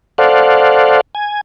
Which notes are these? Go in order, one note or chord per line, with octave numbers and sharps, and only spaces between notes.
A4 C5 D5 F5 F#5
G#5